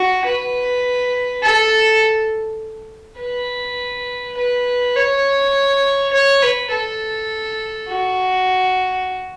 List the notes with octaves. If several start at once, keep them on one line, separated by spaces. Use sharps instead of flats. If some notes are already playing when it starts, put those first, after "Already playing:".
Already playing: F#4
B4
A4
B4
B4
C#5
C#5
B4
A4
F#4